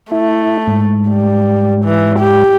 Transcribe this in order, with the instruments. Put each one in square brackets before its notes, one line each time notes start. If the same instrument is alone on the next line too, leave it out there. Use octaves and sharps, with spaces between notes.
[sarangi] A3 [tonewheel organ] E4
[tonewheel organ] G#2
[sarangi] G3
E3
G4